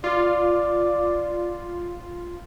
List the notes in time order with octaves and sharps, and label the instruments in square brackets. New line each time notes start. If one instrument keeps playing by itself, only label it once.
[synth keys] F4 [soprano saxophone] D5